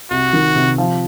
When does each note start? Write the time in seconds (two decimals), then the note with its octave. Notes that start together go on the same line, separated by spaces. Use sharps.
0.11 C2 F#4
0.33 D#3
0.56 C3
0.78 F3